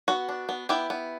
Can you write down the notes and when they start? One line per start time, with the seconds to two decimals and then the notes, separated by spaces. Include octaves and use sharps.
0.08 B3 F#4
0.29 D4
0.49 B3
0.69 B3 E4 G4
0.90 B3